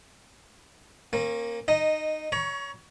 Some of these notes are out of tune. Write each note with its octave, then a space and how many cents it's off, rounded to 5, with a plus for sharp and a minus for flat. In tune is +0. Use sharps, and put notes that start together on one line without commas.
A#3 +0 C#4 -40
D#4 -15 D#5 +0
C#5 +20 A#5 +35 C#6 +0